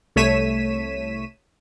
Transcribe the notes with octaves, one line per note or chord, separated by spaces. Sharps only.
C2 A3 C#5 B6 D#7 E7